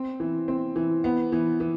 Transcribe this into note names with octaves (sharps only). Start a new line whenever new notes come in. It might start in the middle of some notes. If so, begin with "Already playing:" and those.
Already playing: C4
E3
C4
E3
B3
E3
E3